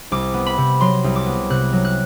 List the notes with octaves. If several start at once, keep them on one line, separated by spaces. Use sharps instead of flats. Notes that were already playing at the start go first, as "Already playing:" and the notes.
C2 D6
B3
B5
C3
F#3 C6
C2
D6
B3
C3 F#6
F#3
F#6